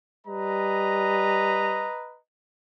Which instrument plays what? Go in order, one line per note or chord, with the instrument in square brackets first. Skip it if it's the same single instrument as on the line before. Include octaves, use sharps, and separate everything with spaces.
[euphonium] G3 [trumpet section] B4 D#5 A#5